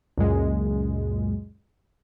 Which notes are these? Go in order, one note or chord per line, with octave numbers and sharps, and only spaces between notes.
C#2 F#2 A#2 G#3